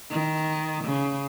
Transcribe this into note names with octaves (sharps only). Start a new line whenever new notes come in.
D#3
C#3